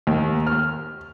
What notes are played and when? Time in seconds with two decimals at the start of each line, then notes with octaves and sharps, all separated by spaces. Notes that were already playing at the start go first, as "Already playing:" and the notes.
0.07 D#2
0.47 F6